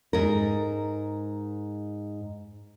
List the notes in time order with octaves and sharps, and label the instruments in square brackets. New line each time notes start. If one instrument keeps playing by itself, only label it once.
[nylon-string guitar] G#2 A#4